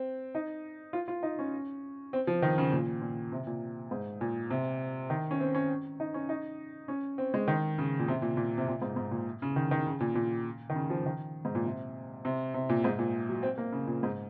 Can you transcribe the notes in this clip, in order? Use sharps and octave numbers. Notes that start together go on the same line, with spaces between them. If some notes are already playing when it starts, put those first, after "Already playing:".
Already playing: C4
D#4
F4
F4
D#4
C#4
C4
F3
D#3
C#3
A#2
A#2
C3
A#2
G#2
A#2
C3
D#3
C#4
C4
C#4
D#4
C#4
D#4
C#4
C4
G#3
D#3
C#3
A#2
C3
A#2
A#2
C3
A#2
G#2
G#2
A#2
C#3
D#3
D#3
C#3
A#2
A#2
D#3
C#3
F3
D#3
G#2
A#2
C3
C3
C3
A#2
G#2
A#2
F#3
C4
A#3
C#3
A#2
G#2